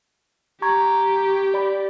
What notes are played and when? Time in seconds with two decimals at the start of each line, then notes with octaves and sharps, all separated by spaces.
0.62 G4 A#5 C#6 G#6
1.54 D5 B5